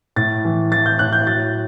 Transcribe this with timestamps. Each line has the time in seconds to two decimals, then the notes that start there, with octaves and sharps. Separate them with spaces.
0.16 A2 A6
0.45 E3
0.71 E3 A6
0.86 G6
0.99 A2 F#6
1.13 G6
1.26 F#3 A6